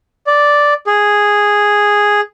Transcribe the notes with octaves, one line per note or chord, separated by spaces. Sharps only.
D5
G#4